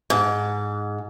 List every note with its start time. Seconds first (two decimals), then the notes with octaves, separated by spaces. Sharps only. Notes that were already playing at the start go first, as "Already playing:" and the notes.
0.10 G#2